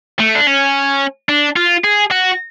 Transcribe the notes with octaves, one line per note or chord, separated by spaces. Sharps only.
A3
D4
C#4
D4
F4
G#4
F#4